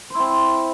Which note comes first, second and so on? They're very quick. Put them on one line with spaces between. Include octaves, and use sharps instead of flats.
C5 E4 C4